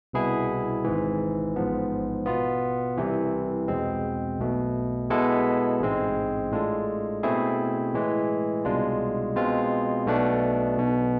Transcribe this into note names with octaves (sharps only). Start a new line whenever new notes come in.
C2 B2 B3 E4 G#4
G#1 G#2 E3
A1 G#2 F3 B3
B2 B3 F4
C2 C3 E3
E2 B2 G#3 C4
B1 B2 A3
B2 G#3 B3 E4 A4
A1 G#2 G#3 C4
A2 G#3 D4 F4 A4
B2 A3 C4 E4 G#4
A2 E3 G#3
C2 B2 G#3 D4 F4
B2 G#3 C4 F4
B1 B2 A3 D4
B1 B2 B3